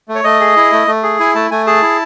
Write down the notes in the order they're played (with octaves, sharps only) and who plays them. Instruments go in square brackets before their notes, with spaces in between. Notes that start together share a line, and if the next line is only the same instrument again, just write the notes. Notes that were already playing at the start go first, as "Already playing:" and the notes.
[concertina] A3
C#5
A3 D#5
G#4
E4
A3
A3
G#4
E4 G#5
A3 A5
A3 G#5
G#4 A5
E4